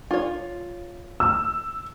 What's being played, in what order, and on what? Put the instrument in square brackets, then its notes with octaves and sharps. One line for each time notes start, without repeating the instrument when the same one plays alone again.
[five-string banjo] F4 C#5
[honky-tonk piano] E6